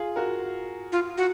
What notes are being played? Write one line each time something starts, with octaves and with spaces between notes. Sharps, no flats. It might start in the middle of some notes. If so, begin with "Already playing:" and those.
Already playing: F4 G#4
F#4 A#4
F4
F#4